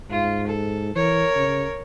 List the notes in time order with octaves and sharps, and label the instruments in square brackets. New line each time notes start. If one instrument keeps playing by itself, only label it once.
[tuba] G#2 [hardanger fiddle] F4
[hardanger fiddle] A4
[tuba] E3 [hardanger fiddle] A#4 C#5
[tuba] C#3